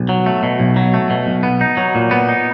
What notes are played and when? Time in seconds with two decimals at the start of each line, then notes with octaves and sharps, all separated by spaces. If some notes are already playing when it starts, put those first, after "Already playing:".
Already playing: B1
0.09 F#3
0.26 A3
0.43 B2
0.60 B1
0.76 F#3
0.94 A3
1.10 B2
1.27 B1
1.43 B3
1.61 D#4
1.77 F#3
1.95 A#2
2.11 B3
2.29 D#4